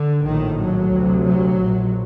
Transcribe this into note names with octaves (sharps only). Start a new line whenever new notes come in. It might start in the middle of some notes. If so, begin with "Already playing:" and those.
Already playing: D3
A#1 A2 D#3
F#3
D2 C3
F#3
A#1 A#2